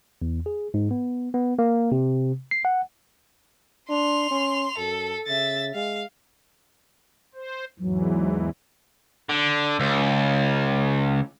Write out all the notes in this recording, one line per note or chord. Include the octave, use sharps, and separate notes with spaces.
E2
G#4
G#2
B3
B3
A#3
C3
C7
F#5
D4 C6 F7
C#4
F#2 A4
C#3 E5 A6
G#3 F5
C5
E2 G#2 E3 F#3
D3
C#2